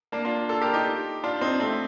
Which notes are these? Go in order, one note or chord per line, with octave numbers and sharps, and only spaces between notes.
A#3 D4
D4 F4
F4 A4
G4 A#4
D#4 G4
D4 F4
C4 D#4
A3 C4